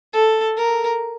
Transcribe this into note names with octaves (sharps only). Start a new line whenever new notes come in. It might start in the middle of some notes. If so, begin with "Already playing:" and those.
A4
A#4